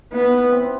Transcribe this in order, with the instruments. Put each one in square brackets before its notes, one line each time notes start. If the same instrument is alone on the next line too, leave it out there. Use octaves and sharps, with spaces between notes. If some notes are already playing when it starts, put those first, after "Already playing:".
[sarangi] B3 [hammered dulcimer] E4
[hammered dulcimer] C4